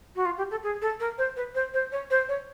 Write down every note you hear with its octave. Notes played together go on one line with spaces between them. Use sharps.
F#4
F4
G4
A4
G#4
A4
A#4
C5
B4
C5
C5
C#5
C5
C#5